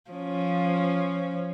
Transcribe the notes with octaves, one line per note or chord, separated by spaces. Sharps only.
F3 C#4